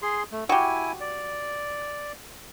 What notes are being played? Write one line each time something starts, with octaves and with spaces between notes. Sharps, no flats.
G#4 C6
A3
E4 F#4 G4 G#5
D5